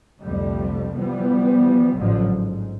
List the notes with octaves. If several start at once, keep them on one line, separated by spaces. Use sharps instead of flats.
C2 F2 D3 G3 A3
E3 F3 G3 B3
A1 A2 D3 F3 F#3
G#2